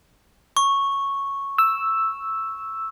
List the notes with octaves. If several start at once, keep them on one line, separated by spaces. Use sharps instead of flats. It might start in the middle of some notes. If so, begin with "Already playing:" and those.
C#6
E6